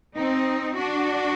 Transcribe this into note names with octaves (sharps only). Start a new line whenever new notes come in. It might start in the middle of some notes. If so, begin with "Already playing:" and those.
C4 D#4
D4 F#4